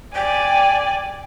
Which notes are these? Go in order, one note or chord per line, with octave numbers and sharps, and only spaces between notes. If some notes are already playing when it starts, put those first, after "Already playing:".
D5 G5 G#5